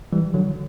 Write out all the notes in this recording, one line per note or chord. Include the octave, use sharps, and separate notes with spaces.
E3 G3
D3 F#3